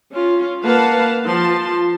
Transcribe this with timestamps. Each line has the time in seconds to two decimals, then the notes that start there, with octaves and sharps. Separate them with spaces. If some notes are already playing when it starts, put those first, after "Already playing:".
0.12 C#4 F4
0.64 A#3 B4 F5 F#5 A5
1.26 F3 F4 A5 C6